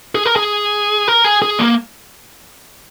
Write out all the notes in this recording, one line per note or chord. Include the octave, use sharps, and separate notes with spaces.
G#4
A#4
G#4
A#4
G#4
G#4
A#3